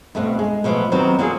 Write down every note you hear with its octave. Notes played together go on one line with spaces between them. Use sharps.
G2 B2 A3 C4 F#4
G#3
B2 F3 F#3 A3 B3
D#3 F#3 B3 C4 D#4
F#3 A#3 C4 D4 F4 G#4